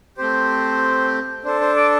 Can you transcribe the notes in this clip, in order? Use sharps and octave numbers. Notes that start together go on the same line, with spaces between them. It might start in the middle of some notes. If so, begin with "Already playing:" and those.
A3 C4 G4 C5
D4 A4 C5
C5
D5